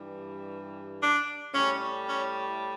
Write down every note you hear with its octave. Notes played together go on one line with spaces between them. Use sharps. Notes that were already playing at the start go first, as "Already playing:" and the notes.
Already playing: G2 E3 G3
D4
A2 G3 C#4
C#4